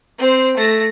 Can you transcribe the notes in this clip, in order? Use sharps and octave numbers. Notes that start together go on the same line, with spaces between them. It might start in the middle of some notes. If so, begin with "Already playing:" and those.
C4 C5
A3 A#6